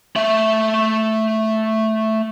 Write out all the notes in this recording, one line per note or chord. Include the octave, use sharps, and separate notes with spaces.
A3 E5